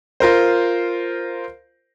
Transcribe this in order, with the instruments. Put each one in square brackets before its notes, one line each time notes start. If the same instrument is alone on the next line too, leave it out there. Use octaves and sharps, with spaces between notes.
[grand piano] F4 A#4 C5